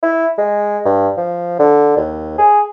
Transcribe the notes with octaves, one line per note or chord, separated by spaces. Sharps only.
E4
G#3
G2
F3
D3
D#2
G#4